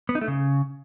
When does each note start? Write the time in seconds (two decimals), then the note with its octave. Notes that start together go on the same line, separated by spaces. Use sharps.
0.09 B3
0.15 D#4
0.21 A3
0.28 C#3